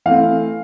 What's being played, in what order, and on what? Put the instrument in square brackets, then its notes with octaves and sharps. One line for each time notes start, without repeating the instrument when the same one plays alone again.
[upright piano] E3 A3 C4 F5